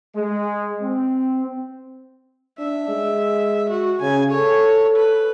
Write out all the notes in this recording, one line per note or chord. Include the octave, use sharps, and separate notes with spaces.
G#3
C4
D4 E5
G#3
F#4
C#3 G#5
A4 C#5
B4